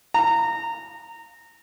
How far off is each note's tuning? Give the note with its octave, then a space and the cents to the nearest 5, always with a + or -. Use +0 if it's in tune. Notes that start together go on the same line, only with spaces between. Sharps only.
A#5 -20